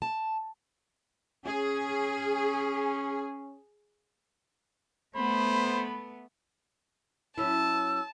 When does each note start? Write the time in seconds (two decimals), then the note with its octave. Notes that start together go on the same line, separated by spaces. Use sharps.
0.02 A5
1.45 C#4 G#4
5.16 A3 B3 C5 B5
7.38 F#3 C#4 E4 A5 E6